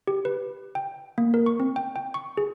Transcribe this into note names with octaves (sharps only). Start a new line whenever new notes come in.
G4
B4
G5
A#3
A#4
C#6
C4
G5
G5
C#6
G#4